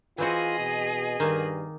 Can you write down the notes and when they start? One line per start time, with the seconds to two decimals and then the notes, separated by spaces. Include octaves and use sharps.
0.18 E3 C4 F4 F#4 G#4 D#5
0.59 B2
1.20 G2 D#3 A#3